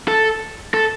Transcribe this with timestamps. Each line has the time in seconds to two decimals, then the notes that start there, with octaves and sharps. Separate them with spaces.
0.08 A4
0.74 A4